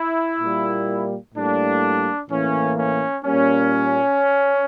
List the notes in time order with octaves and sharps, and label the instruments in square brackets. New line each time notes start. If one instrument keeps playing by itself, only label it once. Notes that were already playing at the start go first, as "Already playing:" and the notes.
Already playing: [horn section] E4
A#2 G3 A#3
A2 G3 A#3 D4
A2 E3 A#3 C#4
C#4
A#2 G3 A#3 C#4